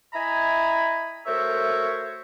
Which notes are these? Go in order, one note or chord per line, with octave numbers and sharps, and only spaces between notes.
E4 D#5 E5 G#5 A#5 B5
A3 F#4 A#4 C5 C#5 E5